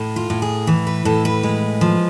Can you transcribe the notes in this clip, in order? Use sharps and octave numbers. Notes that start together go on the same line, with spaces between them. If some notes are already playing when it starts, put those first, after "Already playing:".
Already playing: A2
F4
A2
G#4
E3
B4
A2 A4
B4
G#3
F3